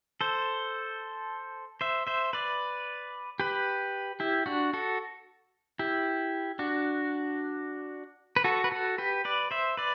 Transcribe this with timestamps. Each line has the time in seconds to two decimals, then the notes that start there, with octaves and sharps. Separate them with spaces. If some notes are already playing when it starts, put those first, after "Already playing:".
0.21 A4 C5
1.81 C5 E5
2.07 C5 E5
2.33 B4 D5
3.40 G4 B4
4.20 E4 G4
4.46 D4 F#4
4.73 F#4 A4
5.79 E4 G4
6.59 D4 F#4
8.36 B4
8.44 F#4 A4
8.64 B4
8.71 F#4 A4
8.98 G4 B4
9.25 B4 D5
9.51 C5 E5
9.77 B4 D5